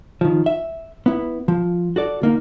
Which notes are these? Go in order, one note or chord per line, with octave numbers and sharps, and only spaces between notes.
D#3 F3
E5
B3 E4
F3
F#4 A4 D5
D2 A#3 D#4